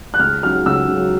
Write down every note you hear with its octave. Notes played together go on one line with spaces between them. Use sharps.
F#6
C#2 F6
C#3 F#3 F6
C#2 E6
C#3 F#3